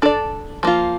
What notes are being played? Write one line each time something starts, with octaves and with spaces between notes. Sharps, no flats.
D4 A4 D5
F3 A#3 F4